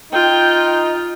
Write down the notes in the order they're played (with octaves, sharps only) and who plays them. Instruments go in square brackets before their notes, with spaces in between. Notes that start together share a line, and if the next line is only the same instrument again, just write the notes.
[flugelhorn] D#4 [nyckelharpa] F4 [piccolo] G5